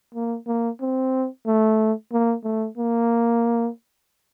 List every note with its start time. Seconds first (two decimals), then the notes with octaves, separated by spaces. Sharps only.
0.14 A#3
0.47 A#3
0.81 C4
1.47 A3
2.12 A#3
2.44 A3
2.77 A#3